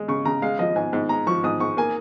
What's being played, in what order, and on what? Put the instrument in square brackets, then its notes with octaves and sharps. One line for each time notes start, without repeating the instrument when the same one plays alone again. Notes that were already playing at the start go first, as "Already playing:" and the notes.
Already playing: [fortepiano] G#3
[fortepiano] C#3 [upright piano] C#6
[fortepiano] C#3 [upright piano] A#5
[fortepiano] G#3 [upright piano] F5
[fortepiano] F3 [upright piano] D#5
[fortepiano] G#2 [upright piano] G#5
[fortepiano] G#2
[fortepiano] G#3 [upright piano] A#5
[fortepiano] F3 [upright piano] C#6
[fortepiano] G#2 [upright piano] D#6
[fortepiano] G#2 [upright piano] C#6
[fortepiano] A#3 [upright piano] G#5